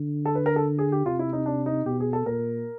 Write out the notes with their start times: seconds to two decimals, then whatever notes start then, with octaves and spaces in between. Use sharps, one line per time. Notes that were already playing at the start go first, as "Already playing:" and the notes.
Already playing: D3
0.25 A4
0.35 B4
0.46 A#4
0.56 A4
0.78 G#4
0.92 G4
1.06 C3 F4
1.19 E4
1.33 D#4
1.46 D4
1.66 D#4
1.86 B2 G4
2.00 G#4
2.13 A4
2.26 A#2 A#4